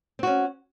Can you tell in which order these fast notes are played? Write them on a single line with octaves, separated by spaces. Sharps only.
C4 F#4 C#4